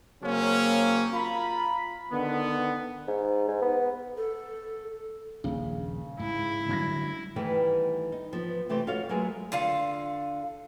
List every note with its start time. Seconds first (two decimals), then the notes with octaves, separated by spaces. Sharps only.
0.22 C#3 F#3 A#3 C4 C#4
1.14 F4 A#5 B5
2.11 D3 D#3 B3
3.07 G#2
3.48 G#2
3.62 B3
4.17 A4
5.44 D#1 A#1 C#3
6.19 G#2 G#3 E4
6.69 F#2 D3 G3 A3 G#6 A#6
7.36 D#3 E3 G3 A3 B3 B4
8.12 D#4
8.33 F3 B3
8.69 C3 E3 A3 C4 G4 C5
8.87 F4 F#4 A4 C#5 F5
9.09 F#3 G#3 A3 G#4 A#4 B4
9.52 D3 F4 F5